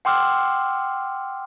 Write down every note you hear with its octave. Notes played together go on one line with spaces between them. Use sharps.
F#5 G5 C6 D6 E6 F6